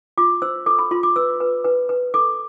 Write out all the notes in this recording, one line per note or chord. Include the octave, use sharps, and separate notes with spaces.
F4 D6
C5 E6
A4 D6
B5
F4 C6
D6
B4 E6
B4
B4
B4
A4 D6